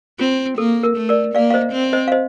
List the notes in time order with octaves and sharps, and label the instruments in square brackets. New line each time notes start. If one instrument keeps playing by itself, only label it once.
[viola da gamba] C4 [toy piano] F4
[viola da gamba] A#3 [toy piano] A4
[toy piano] A#4
[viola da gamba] A3
[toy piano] A#4 D5
[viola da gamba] A#3 [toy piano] D5 F5
[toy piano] F5
C5 D#5
[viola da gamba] C4
[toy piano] C5 D#5
F5
C5 D#5